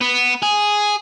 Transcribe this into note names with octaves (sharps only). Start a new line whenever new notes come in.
B3
G#4